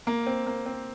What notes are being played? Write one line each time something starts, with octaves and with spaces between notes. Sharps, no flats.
A#3
C4
A#3
C4